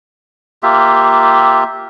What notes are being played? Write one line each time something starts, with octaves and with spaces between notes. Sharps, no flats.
A#3 F4 G4 E5